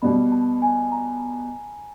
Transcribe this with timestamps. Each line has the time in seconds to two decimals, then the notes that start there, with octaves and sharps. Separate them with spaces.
0.02 B2 G3 B3 B5
0.32 A5
0.62 G#5
0.92 A#5